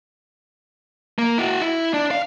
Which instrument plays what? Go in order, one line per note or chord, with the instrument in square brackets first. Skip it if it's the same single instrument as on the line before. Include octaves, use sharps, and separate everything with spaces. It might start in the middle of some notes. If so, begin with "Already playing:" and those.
[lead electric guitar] A#3
E4 F#4
E4
D4
F5